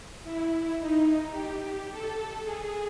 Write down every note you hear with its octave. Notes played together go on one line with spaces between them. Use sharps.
E4
D#4
G4
A4
G#4